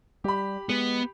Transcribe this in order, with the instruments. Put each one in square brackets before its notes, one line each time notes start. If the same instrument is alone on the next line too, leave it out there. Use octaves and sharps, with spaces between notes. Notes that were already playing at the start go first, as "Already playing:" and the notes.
[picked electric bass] G3 [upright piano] G4 B5
[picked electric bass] G#3 [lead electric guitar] B3